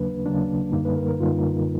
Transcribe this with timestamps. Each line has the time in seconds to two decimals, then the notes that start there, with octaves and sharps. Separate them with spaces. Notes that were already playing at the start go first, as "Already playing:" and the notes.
Already playing: D#2 C#3 F#3 A#3 D4 B4
0.26 D#2 C#3 F#3 A#3 D4
0.72 F#2 D3 G3 A#3 D#4
0.85 B4
0.96 A#4
1.08 A#4
1.20 F#2 D3 G3 A#3 D#4 F4